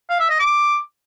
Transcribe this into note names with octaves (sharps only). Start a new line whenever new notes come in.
F5
E5
D#5
D6